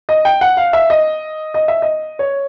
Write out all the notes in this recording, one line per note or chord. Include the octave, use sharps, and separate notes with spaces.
D#5
G5
F#5
F5
E5
D#5
D#5
E5
D#5
C#5